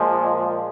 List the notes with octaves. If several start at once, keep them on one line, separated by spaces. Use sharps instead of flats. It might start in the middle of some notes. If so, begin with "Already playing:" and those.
Already playing: A#2 F3 G#3